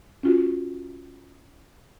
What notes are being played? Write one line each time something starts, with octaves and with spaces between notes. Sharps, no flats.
C#4 F4 F#4